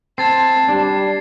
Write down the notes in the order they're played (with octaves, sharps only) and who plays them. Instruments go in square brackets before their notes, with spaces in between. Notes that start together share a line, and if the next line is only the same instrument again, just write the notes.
[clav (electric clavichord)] C4 [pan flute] A5 [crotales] G#6 A6 C7
[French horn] G3 [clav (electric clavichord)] D4